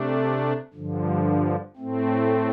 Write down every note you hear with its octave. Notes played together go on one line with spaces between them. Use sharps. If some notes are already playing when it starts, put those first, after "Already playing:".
Already playing: C3 A3 D4
G2 D3 F3
A2 A3 C4